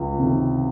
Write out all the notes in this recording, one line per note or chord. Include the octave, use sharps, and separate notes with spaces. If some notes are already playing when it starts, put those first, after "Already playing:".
Already playing: C#2
C3 D#3